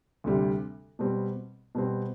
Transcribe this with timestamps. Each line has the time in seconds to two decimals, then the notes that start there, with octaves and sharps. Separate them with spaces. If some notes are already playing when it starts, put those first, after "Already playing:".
0.24 D2 C3 G3
0.99 B2 G3 C4
1.75 B2 G3 C4